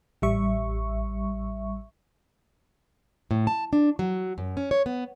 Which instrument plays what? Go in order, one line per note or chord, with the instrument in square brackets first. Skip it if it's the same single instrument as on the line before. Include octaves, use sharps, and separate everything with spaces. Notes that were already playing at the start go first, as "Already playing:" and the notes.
[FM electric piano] A1 G3 E5 C#6
[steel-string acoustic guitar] A2
A5
D4
F#3
F#2
C#4
C#5
B3